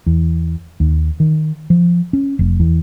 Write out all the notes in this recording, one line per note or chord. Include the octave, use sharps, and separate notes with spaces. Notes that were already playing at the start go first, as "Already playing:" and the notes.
E2
D#2
D#3
F3
C#4
F1
E2